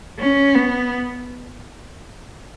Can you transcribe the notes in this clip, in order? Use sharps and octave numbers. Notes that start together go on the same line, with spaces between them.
C#4
B3